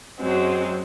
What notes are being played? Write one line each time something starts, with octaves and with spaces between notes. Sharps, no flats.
F#2 F#3 G#3 C4